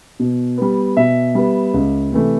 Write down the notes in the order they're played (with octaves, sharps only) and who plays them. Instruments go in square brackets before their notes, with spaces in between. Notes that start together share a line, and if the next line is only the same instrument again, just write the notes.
[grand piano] B2
G3 B3
B2 E5
G3 B3
C#2
C3 E3 A3